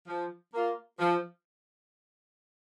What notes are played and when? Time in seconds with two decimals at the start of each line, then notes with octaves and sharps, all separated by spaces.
0.07 F3
0.53 A#3 F4
0.99 F3